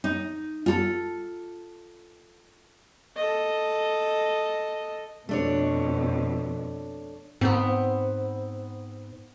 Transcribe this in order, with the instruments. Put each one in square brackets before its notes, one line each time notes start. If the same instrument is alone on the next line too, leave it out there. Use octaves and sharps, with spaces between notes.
[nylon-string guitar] D#4
F4 A4
[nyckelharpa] A4 D#5
[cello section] F2 B2 [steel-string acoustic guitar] A3 D4 C#5
[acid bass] G#2 [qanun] B3 C4